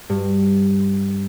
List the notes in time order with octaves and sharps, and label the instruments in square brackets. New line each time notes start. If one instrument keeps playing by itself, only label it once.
[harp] G2